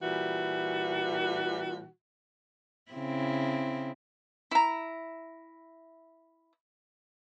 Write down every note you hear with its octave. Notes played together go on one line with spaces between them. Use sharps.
A#2 E3 G3 F#4
C#3 C4 E4
E4 A#5